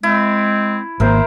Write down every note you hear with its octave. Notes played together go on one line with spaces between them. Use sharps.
G#3 C4 E4
G#1 A#3 A#4 C5 E5